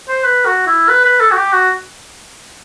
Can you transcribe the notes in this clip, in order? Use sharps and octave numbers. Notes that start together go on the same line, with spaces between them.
C5
B4
F#4
E4
B4
B4
A4
F#4
G4
F#4